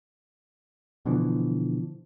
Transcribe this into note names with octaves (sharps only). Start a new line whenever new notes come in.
B2 D3 E3 F3